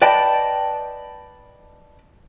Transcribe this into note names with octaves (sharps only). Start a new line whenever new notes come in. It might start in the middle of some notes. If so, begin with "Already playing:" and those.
B4 D5 D#5 G5 A5 B5